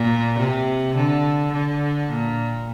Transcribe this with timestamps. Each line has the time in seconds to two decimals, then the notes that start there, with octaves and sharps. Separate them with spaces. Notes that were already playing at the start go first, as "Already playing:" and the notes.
Already playing: A#2
0.39 C3
0.96 D3
1.53 D3
2.10 A#2